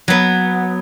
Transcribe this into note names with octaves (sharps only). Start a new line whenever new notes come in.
F#3 B3